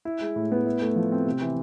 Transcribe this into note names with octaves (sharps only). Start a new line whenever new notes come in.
E4
G#3
A2
B3
E4
A3
F3
C4
C3
E3